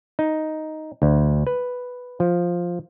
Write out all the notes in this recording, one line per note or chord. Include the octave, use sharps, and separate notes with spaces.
D#4
D2
B4
F3